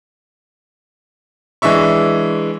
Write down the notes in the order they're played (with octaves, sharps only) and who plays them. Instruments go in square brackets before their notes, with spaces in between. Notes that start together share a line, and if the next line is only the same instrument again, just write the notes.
[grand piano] E3 G#3 D4 E5 C#6